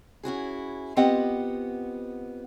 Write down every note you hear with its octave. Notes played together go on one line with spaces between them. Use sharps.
C#4 E4 F#4 G#4
B3 C4 F4 G4 D#5 F#5